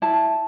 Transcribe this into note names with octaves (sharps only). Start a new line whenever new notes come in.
E4 A5